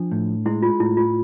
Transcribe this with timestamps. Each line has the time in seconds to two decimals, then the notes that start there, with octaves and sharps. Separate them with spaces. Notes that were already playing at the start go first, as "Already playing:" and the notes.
Already playing: F3 D4
0.11 A2
0.46 G#3 E4
0.62 F4
0.80 A2 E4
0.97 F4